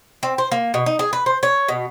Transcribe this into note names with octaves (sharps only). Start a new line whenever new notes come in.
C4
C5
A#3
B2
D#4
G#4
B4
C5
C#5
B2